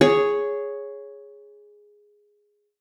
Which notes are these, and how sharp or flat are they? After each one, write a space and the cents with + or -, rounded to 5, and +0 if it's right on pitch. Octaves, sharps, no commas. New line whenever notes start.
G#4 +0 C#5 +0